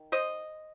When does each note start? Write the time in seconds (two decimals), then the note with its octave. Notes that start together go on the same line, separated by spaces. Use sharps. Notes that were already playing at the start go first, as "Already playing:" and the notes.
Already playing: D#3
0.12 C5 D#5